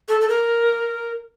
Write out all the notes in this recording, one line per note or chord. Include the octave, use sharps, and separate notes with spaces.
A4
A4
A#4